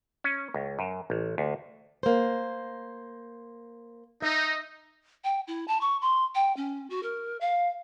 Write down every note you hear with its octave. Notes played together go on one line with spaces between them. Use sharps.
C#4
C#2
F#2
A1
D2
A#3 C5
D#4 E5
G5
E4
A5
C#6
C6
G5
C#4
F#4
A#4
F5